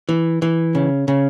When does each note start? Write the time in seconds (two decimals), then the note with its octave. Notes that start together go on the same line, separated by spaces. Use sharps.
0.09 E3
0.42 E3
0.75 C#3
1.08 C#3